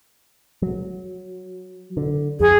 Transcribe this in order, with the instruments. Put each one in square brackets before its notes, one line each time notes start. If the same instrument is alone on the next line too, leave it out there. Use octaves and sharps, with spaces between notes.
[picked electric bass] F#3
D3
[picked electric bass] F2 [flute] G#4